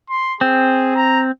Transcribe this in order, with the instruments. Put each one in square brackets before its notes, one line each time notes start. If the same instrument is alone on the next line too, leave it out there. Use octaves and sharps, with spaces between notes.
[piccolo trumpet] C6
[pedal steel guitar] C4 [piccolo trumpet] G#4
[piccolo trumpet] A#5